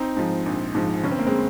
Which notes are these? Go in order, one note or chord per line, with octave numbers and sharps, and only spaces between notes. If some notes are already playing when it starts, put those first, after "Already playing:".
Already playing: C4 D#4
G#2 F3
A#1
G#2 F3
G1 C#4
C4
A#3
G#3 C4